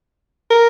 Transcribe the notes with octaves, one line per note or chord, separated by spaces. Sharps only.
A#4